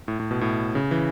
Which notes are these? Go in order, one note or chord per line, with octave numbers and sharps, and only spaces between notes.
A2
A2
B2
A2
C#3
E3